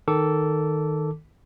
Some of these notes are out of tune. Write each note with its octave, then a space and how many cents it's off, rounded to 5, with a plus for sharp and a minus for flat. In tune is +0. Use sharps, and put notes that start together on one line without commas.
D#3 +0 A4 +0 D6 -20